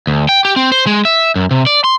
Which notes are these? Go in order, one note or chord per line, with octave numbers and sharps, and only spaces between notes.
D2
G5
G4
C4
C5
G#3
E5
F#2
C3
D5
C6